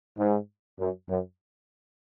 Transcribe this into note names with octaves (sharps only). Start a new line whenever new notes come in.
G#2
F#2
F#2